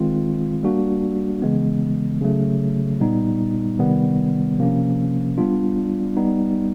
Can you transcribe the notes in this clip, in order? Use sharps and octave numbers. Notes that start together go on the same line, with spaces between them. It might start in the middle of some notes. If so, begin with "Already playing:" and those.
Already playing: D#3 G#3 C4 F4
G3 A#3 D4 F#4
C#3 E3 G#3 B3
C#3 F#3 A3
A#2 G3 B3 D#4
C3 D#3 G3 B3
C3 F3 A#3 C#4
G3 B3 D4 F4
G3 B3 D#4